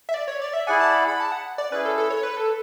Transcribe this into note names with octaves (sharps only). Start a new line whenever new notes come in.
E5
D5
C#5
D5
E5
E4 G#4 D5 F#5 G#5
A5
B5
B5
A5
F#5
D5
C#4 E4 G#4 B4
A4
A4
C#5
B4
A4